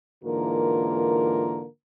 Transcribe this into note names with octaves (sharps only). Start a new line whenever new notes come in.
G#2 D3 E3 A#3 F4 A#4